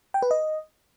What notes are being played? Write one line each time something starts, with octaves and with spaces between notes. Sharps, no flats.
G5
B4
D#5